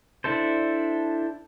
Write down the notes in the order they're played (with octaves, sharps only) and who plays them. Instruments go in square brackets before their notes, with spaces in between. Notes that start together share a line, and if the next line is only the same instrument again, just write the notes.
[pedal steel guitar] D4 E4 A4 C5